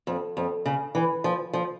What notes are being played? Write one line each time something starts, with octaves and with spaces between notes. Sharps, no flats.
F2
F2
C#3
E3
F3
F3